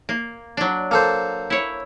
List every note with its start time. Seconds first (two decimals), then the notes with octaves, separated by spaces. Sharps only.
0.09 A#3
0.57 F#3 D4
0.91 A#3 A4 C5
1.50 E4 C#5